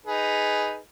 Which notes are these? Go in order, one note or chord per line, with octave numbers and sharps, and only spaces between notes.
D#4 G#4 B4